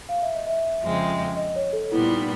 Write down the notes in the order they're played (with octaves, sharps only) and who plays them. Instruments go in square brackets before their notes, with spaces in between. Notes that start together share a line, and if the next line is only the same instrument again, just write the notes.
[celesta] F5
E5
D#5
E5
[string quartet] F2 C#3 F3 G#3 C4
[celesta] D#5
C#5
A4
[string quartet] A#2 G3 B3 [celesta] E4
[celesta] D#4